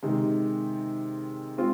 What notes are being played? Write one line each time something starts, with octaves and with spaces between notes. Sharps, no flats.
C3 D#3 G#3
G#3 C4 F4